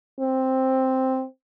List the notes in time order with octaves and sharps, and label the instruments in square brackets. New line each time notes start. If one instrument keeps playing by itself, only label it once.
[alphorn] C4